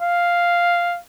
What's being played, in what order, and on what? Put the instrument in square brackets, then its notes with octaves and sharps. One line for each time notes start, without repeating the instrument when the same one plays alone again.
[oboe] F5